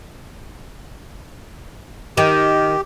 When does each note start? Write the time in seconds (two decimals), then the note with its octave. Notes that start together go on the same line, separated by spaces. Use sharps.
2.17 D#3 G4